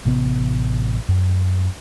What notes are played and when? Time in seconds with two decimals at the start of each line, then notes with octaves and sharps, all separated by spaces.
0.06 A1 C3 B3
1.08 F#2